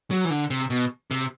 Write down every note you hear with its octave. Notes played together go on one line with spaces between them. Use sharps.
F#3
E3
D3
C3
B2
C3